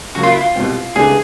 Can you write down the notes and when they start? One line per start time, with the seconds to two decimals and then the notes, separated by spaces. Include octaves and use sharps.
0.15 C#3 F#3 A#3 F#4
0.23 F4
0.32 E4
0.41 F4
0.55 C2 B2 G3 C4
0.95 C#2 C3 E3 A3 D4 G#4